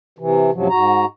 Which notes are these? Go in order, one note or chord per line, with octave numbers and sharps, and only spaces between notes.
C3 E3
F#2 A2 C3 F3 F#3
G#2 F#4 A#5